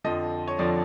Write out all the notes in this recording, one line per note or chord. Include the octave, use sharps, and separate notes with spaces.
F2 D3 F3 D#5
C#5
F2 D3 F3 D5